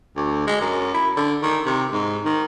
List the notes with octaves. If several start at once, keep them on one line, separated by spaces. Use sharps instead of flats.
D2
G#3
F#2
E4
D3
D#3
C3
G#2
D#3